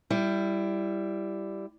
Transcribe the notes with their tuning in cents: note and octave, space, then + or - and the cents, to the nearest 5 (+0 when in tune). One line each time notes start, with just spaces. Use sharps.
G3 +0 E4 +15